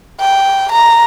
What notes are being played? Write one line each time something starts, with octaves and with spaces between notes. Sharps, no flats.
G5
A#5